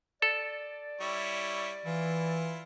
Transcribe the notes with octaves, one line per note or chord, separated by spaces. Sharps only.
A4 D5
G3 E4 C#5
E3 E4 F4